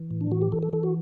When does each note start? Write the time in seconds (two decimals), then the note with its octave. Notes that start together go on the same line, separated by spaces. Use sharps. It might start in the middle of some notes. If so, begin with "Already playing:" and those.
Already playing: E3
0.11 A2
0.21 D4
0.31 E3 F#4
0.42 G4
0.52 E3 A4
0.63 A4
0.73 E3 A4
0.83 F#4